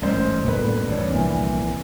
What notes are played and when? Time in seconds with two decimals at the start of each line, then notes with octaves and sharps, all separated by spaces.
0.02 A1 G#2 C#4 C5
0.44 G1 A2 A#3 B3 D4 B4
0.88 G1 E2 A2 D4 C#5
1.10 C2 A#2 E3 F3 C4